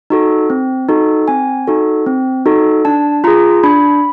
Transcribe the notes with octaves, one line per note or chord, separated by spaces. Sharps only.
D#4 F#4 A4
C4
D#4 F#4 A4
C4 G#5
D#4 F#4 A4
C4
D#4 F#4 A4
D4 A5
F4 G#4 A#5
D4 B5